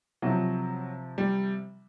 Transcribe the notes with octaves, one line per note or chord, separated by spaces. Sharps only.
C3 F3 F#3
G3